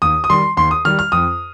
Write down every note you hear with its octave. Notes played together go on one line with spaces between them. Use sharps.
D#2 D#6
D#6
D#3 G3 C6
D#2 C6
D#6
D#3 G3 F6
F6
F2 D#6